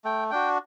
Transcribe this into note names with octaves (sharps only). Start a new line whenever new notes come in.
A3 G5
D4 F#4 G5